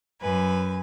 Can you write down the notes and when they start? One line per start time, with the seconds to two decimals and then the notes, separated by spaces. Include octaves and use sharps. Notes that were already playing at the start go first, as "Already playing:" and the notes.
0.22 F#2 B4 G#5